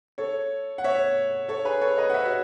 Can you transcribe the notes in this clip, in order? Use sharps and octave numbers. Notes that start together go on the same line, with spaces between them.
A4 C#5
F#5
C#5 E5
A4 C#5
G#4 B4
A4 C#5
B4 D#5
F#5
C#5 E5
F#4